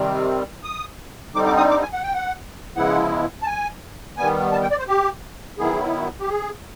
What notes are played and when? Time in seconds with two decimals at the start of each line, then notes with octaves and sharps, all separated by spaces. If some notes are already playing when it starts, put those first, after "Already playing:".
Already playing: C3 D#3 G3 C4
0.64 D#6
1.34 D3 G3 C4 D#4 D6
1.46 D6
1.57 D#6
1.70 D6
1.82 G#5
1.93 F#5
2.03 G5
2.14 F#5
2.76 C#3 F3 G#3 B3 E4 F#5
3.42 A5
3.46 G#5
4.17 D#3 G3 B3 G#5
4.52 A5
4.62 G5
4.71 D5
4.79 C5
4.88 G4
5.59 D#3 F#3 B3 E4 G#4
6.20 G4
6.29 G#4